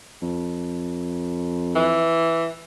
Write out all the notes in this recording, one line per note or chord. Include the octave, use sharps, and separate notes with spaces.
F2
E3